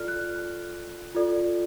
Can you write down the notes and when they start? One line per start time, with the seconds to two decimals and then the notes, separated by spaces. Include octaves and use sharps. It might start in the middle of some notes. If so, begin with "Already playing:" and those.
Already playing: F4 A4 D5 F6
0.08 F#6
1.14 F4 A4 D5